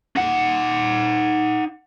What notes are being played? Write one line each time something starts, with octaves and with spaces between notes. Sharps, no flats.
D#4 F#5